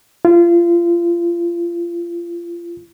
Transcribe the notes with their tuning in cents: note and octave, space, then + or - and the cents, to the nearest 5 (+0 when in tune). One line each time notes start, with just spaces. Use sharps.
F4 -30